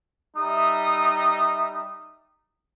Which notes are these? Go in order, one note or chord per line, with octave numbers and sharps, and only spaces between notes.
G3 D#4 E5 D#6